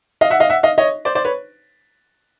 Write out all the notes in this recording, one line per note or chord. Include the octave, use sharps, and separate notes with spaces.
D#5 F5
E5 F#5
D#5 F5
E5 F#5
D#5 F5
C#5 D#5
C5 D5
C5 D5
B4 C#5